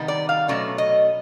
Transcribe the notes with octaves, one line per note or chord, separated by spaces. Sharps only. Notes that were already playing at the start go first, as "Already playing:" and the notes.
Already playing: C3 D#3 G3 B3
D5
F5
B2 F#3 A3 C#4 D5
D#5